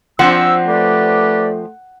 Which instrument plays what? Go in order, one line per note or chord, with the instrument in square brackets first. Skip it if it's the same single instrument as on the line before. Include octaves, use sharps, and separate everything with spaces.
[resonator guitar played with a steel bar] F3 C4 D4 [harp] F#5 [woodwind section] E6
[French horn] A3 [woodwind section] G4 B4 D5